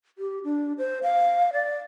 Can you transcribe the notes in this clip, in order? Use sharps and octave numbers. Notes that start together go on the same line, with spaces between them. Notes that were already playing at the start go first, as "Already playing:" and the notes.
G4
D4
C5
F5
D5